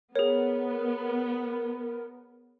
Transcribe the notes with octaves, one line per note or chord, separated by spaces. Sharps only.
B3 G#4 A#4 C#5